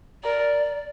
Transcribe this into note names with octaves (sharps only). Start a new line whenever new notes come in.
A#4 D5